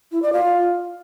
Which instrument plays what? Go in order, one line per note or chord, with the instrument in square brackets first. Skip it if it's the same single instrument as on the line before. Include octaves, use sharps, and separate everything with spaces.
[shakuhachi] E4
D5
F4